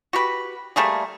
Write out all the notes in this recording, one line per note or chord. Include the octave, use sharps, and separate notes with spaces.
F#4 G4 B4
G3 A3 A#3 G#4